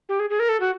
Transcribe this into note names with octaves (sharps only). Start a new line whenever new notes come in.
G4
G#4
G#4
A#4
A4
F#4